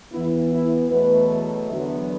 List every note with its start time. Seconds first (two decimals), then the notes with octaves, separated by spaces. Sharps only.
0.12 E2 E3 B3 E4
0.52 E4
0.90 E2 B2 F#3 A3 F#4 B4
1.70 E2 D3 F#3 B3